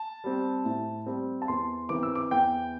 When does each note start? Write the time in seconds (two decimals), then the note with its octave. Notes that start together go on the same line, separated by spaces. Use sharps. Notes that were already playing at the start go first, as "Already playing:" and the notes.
Already playing: A5
0.24 G3 C4
0.65 A2
1.06 G3 C4
1.42 A5
1.48 E2 C6
1.89 E3 C4 D6
2.03 E6
2.15 D6
2.31 E2 G5